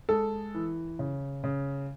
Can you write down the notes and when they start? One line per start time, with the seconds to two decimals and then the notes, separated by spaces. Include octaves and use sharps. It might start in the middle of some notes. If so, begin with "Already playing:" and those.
0.09 G#3 A4
0.55 E3
0.99 C#3
1.44 C#3